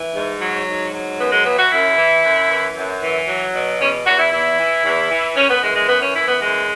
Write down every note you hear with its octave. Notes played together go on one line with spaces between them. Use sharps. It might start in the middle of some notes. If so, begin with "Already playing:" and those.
Already playing: E3
G#2
F#3
G#2
F#3
F#2 B3
G#3
E3 B3
F#4
F#2 E4
E3
F#2
E3
F#2
E3
F#3
B2
E2 C#4
E2 F#4
E4
E2 E4
E3
E2
E3
F#2 C#4
B3
E3 G#3
G#3
F#2 B3
C#4
E3 E4
B3
F#2 G#3